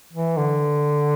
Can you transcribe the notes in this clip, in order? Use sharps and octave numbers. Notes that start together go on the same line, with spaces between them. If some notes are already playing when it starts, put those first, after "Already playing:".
E3
D3